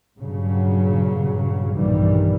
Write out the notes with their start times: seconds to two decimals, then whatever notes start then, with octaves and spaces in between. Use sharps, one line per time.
0.18 G2 A#2 C#3 F#3
1.75 B1 G2 A#2 D#3 E3 G3